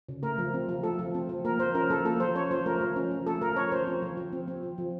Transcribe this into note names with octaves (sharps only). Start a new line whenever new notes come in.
C#3
A3 A#4
F3
C4
F3
A3 A4
F3
C4
F3
A#3 A#4
F3 C5
C#4 A#4
F3 A4
A#3 A4
F3 C5
C#4 C#5
F3 C5
A3 A#4
F3
C#4
F3
A3 A4
F3 A#4
C#4 C#5
F3 C5
C4
F3
F3
C4
C4
F3
F3